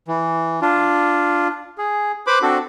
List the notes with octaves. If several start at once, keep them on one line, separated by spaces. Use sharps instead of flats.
E3
D4 F4
G#4
B4 C5 B5 D6
C4 D4 F#4 A4